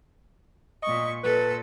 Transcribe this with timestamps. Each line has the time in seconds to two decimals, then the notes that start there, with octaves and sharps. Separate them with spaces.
0.83 A#2 D#5 C#6
1.23 A#2 A4 B4